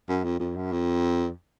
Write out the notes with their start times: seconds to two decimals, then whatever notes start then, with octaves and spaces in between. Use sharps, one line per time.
0.09 F#2
0.24 F2
0.39 F2
0.56 F#2
0.72 F2